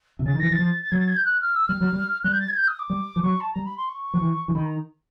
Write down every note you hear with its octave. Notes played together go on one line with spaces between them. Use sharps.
C3
C#3 A6
D#3
E3 A#6
E3 A6
F3
A6
F#3 G#6
A6
G#6
G6
F#6
F6
E6
G3 F6
F#3
G3
G3 F#6
G6
A6
G#6
G6
D#6
D6
G3
F3
F#3 C#6
A5
G3 A#5
B5
C6
C#6
F3
E3
E3
D#3 B5
A#5